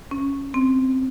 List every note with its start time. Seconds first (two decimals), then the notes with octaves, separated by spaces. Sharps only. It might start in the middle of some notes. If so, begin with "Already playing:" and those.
0.11 C#4
0.54 C4